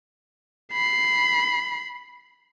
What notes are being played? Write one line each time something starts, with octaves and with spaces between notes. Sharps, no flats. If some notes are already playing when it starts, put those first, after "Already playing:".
B5 C7